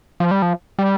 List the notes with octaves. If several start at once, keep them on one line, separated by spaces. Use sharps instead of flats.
F3
G3
F3
G3